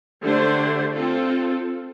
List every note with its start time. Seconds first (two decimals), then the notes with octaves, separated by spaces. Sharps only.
0.23 D3 A3 D4 G4 C5
0.94 C4 F4 A4